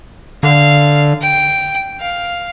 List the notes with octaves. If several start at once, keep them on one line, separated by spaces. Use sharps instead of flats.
D3 F5
G5
F5